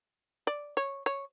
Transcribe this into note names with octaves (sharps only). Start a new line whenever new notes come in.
D5
C#5
C#5